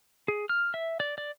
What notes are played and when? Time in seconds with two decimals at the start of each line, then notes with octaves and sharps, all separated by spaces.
0.28 G#4
0.49 F6
0.74 E5
1.00 D5
1.18 D5